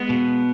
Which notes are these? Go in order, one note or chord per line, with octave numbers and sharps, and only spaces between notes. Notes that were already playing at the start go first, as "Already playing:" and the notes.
Already playing: G#3 B3
B2